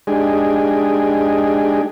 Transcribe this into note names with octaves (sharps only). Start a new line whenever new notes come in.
G#3 D4 D#4 G4 G#4